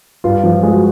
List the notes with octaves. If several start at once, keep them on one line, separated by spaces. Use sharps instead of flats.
G2 F4
F3
G#3
F#4